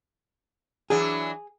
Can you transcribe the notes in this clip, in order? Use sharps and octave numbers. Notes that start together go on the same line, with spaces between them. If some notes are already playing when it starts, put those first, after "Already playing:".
E3 F#3 D4 G#4